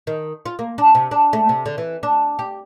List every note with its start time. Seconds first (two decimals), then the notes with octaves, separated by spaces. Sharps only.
0.07 D#3
0.46 F4
0.59 A#3
0.78 D4
0.95 C3
1.11 D4
1.33 A3
1.49 C3
1.66 D3
1.78 E3
2.03 D4
2.39 G4